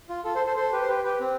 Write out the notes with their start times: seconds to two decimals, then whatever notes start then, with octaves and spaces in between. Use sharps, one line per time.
0.09 F4
0.24 F4 A4
0.35 A4 C5
0.46 A4 C5
0.56 A4 C5
0.72 G4 B4
0.82 C5
0.88 G4 B4
1.04 G4 B4
1.20 C4